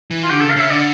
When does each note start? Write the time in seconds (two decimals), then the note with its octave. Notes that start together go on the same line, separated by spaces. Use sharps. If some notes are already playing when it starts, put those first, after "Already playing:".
0.11 E3
0.24 F4
0.30 D3 G4
0.40 A4
0.44 C#3
0.51 F5
0.56 C#3 E5
0.70 D3 D5